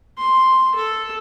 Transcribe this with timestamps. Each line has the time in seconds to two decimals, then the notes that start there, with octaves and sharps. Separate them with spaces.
0.18 C6
0.76 A4